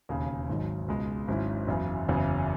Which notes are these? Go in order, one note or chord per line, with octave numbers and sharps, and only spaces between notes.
E1 D#2 C#3
G#1 G#2 D#3 F#3
C#2 B2 G#3
G#1 G#2 F#3 C#4 E4
F#1 E2 C#3 F#3
F#1 E2 C#3 F#3